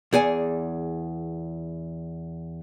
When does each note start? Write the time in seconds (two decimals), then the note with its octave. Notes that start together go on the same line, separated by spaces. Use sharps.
0.13 E2 G#4 D5 G#5